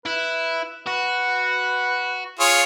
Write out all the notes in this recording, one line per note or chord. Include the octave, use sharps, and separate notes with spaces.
E4 B4
F#4 B4
F4 G#4 C#5